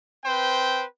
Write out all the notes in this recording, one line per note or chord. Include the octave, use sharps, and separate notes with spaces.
C4 B4 C5 G5